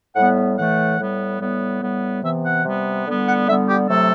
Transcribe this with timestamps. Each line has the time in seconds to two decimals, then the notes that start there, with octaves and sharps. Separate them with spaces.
0.16 A2 G3 B3 F#5
0.58 A2 E3 A3 F#5
0.99 A2 G3 B3
1.40 A2 G3 B3
1.82 A2 G3 B3
2.23 C3 E3 B3 E5
2.44 F#5
2.65 C3 G3 B3
3.06 D3 G3 B3
3.27 F#5
3.48 D3 G3 B3 E5
3.69 G4
3.89 C3 F#3 A3 A4